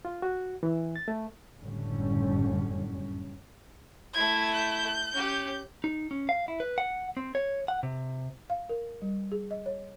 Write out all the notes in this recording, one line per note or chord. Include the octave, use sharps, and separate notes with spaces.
F4
F#4
E3
A6
A3
F#1 F2 A2 D3 G3 C#4
A3 E4 G#6
G6
C#4 G4
D#4
C#4
F5
E4
B4
F#5
C4
C#5
F#5
C3
F5
A#4
G3
G#4
D#5
C#5